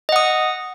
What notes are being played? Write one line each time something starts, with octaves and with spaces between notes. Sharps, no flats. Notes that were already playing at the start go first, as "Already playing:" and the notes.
D#5 F#5 D#6